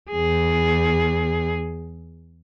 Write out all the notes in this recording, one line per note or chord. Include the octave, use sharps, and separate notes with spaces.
E2 G#4